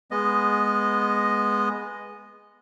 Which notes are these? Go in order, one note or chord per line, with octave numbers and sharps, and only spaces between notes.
G#3 B3 D#5